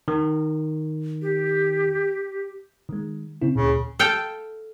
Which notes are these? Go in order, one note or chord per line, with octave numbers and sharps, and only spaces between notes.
D#3
G4
D#3 G#3
C#3 C4 E4
D2 A#2 C#3
A4 F5 G5